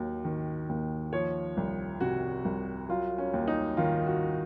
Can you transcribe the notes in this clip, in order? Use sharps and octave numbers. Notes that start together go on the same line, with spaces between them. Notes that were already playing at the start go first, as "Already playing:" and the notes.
Already playing: D#2 F#3
D#3
D#2
F3 C#5
C2
C3 F#4
C2
F#3 F4
C#4
D#2
D#4
D#3 F4
F#4